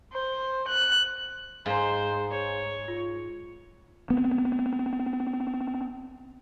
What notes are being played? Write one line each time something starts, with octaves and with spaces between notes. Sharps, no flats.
C5
F#6
G#2 C5 F5 G#5 A#5
C#5
F4
B3 C4